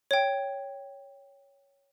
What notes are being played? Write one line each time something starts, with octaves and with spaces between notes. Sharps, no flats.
C#5 G5